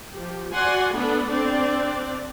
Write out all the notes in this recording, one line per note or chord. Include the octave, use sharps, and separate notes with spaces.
F3 G4
F#4 D5 F#5 G#5 C6
A3 B3 D4 A4 B4
C4 D4 D5